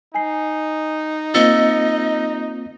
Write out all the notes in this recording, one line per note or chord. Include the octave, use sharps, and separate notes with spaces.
D#4 G#5 C7
A#3 C4 F4 D#5 E6 A6 C#7